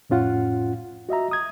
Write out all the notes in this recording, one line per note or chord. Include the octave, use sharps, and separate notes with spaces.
F2 A2 C#4 F4 F#5
F#4 D#5 E5 A#5
D#6 G#6